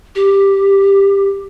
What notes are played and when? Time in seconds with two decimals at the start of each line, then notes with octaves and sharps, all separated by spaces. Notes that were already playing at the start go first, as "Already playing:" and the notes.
0.15 G4